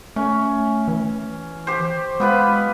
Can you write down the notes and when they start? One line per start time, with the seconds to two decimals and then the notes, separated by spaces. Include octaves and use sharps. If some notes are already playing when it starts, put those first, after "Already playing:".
0.16 A3 C#4
0.88 E3
1.67 G4 C5
2.20 G#3 B3 F4 B4